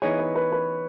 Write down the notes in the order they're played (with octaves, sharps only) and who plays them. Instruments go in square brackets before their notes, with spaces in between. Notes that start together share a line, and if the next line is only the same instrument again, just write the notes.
[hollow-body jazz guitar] E3 B3 D#4 G#4 [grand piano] C#5
[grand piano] B4
B4
B4